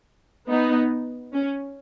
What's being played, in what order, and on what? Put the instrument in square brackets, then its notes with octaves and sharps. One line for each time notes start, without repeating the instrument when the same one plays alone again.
[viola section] B3 D#4
C#4